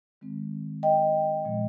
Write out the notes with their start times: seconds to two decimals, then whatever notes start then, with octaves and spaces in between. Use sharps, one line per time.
0.21 D#3 G#3 C4
0.83 D#5 G5
1.45 A#2 F3 G#3